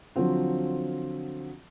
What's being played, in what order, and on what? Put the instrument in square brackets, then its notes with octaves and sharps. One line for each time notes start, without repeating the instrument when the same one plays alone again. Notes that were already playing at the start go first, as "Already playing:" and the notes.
[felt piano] D3 F3 F#3 C4 F4